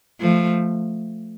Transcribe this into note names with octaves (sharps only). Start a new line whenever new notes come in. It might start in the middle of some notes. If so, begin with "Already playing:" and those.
F3 A3